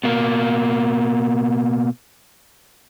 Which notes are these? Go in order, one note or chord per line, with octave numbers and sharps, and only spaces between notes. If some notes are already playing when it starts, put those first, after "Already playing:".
B2 A#3